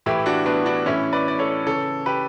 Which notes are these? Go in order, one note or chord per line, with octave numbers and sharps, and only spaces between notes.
A2 E3 E4 G4
D4 F#4
B3 D4
D4 F#4
A2 E3 C#4 E4
B4 D5
D5
A4 C#5
C#3 E3 A4 C#5
G4 B4